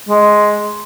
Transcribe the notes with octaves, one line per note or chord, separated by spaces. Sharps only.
G#3